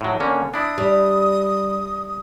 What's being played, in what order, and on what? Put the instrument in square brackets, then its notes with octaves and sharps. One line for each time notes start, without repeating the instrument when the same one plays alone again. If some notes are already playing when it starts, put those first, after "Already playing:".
[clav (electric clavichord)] A2 F#3
D3 A#3 C#4
[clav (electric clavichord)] D4 E4 [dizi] D#6
[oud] G3